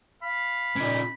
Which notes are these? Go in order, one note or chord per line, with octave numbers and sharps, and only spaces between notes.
F5 B5
A#2 C#3 D#4